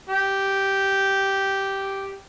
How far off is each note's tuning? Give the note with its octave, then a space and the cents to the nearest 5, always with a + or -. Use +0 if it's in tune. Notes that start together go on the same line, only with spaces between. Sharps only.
G4 -5